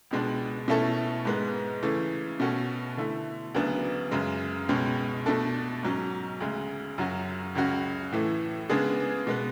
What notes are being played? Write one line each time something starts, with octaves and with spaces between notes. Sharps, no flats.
C#2 B2 G#3 D4
B2 A3 C#4 E4 A4
G#2 G#3 B3
C#3 E3 A3
B2 A3 C#4 F#4 A4
D3 A3 E4
D2 C#3 F#3 B3 D4
F#2 C#3 G#3
C#2 B2 G#3 C#4
B2 A3 D4 A4
G#2 F#3 C#4
D2 C#3 G#3
F#2 C#3 F#3 C#4 F#4
C#2 C#3 F#3 C#4 F#4
A2 E3 A3
C#3 G#3 B3 D4 G#4
B2 G#3 B3